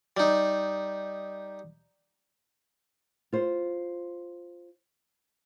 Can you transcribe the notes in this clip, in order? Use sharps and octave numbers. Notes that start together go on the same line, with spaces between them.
G3 D#4
F4 C5